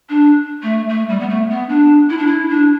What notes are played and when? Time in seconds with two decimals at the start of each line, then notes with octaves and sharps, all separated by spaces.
0.09 D4
0.63 A3
0.89 A3
1.09 G3
1.20 B3
1.29 A3
1.50 B3
1.69 D4
2.10 E4
2.18 D4
2.26 E4
2.49 D4